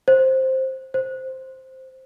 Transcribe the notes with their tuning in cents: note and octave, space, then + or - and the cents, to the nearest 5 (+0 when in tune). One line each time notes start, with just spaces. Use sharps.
C5 +5
C5 +0